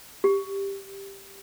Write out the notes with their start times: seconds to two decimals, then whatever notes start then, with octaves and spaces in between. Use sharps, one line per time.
0.24 G4